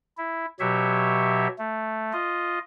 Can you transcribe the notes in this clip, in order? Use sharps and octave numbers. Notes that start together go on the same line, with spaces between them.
E4
B2 F#3 G4 C#5 E5
A3
F4 D#5